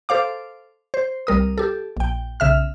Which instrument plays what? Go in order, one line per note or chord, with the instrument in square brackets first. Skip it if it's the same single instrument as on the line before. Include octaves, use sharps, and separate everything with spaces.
[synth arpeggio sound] A4 C5 F5 D6
C5
C2 G3 A#4 D#6
G4 A4
A#1 G5
B1 C#3 E5 F6